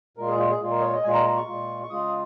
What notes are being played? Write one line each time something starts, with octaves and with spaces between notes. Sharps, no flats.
A#2 G#3 F4 A#4
G#4
F4
G#4
A#2 G#3 F4
A#4
D#5
C#5
D#5
A#2 G#3 F4 G#5
A#5
A#5
C#6
A#2 G#3 F4
C#6
C#3 G#3 F4 D#6